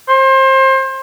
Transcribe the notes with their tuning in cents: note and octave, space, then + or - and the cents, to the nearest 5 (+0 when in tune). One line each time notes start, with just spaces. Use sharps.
C5 +30